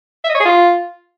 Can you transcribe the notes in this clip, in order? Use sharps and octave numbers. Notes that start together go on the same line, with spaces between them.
E5
D#5
C#5
G#4
F4